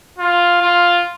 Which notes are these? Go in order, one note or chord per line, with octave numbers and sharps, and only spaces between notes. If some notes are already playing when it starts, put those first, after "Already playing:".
F4
F4